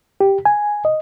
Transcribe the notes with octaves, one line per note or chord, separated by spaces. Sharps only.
G4
G#5
D#5